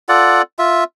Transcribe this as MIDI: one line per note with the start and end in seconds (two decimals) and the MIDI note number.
0.09 0.42 65
0.09 0.42 69
0.09 0.42 74
0.09 0.42 78
0.59 0.84 65
0.59 0.84 76